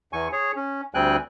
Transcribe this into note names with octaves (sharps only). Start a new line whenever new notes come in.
E2 G#5 C#6
G#4 C#5
C#4
D2 G3 C4 G5 G#5 F#6